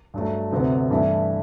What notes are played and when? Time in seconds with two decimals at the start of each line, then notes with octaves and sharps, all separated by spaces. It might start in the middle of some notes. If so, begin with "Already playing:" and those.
0.14 G2 F#3 A3
0.51 D2 C3 F#3 B3
0.90 G2 E3 A3 E4